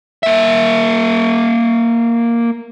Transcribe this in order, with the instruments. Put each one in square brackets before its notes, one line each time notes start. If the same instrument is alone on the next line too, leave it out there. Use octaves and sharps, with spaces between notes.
[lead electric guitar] A#3 E5